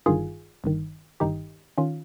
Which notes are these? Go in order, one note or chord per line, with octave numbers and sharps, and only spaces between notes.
G1 G2 D#3 F4 G#4
G1 G2 D#3
G1 G2 D#3 D#4 G4
D#3 C#4 F4